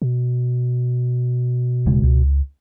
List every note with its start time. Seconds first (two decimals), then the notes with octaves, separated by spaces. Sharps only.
0.02 B2
1.86 D#1 C#3 G#3
2.03 C#2